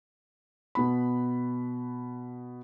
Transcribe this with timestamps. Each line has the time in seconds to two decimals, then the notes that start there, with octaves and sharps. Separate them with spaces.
0.75 B2 B3 B5